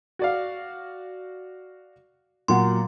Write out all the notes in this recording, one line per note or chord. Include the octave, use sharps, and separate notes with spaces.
F#4 D5 F5
A#2 F#3 F#5 C6